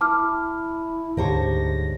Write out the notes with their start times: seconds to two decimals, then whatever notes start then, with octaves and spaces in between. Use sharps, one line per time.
0.01 E4 A5 D6 F6
1.17 D2 G#2 D3 G4 C5 C#5 A#6